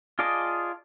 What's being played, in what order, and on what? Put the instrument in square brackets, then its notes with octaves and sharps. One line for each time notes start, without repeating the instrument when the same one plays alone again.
[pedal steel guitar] F4 G#4 D5 D#5 A5